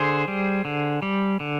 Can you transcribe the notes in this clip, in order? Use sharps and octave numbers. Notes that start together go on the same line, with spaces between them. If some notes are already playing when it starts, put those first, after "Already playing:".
Already playing: D3 G#4 C5
G3
D3
G3
D3